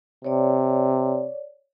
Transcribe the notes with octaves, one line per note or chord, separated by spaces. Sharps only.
C3 C#5 D5